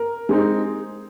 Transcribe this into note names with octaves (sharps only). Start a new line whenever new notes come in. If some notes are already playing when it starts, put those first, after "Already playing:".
Already playing: A#4
G#3 C4 D#4